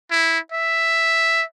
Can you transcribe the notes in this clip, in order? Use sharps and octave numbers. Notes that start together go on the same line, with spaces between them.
E4
E5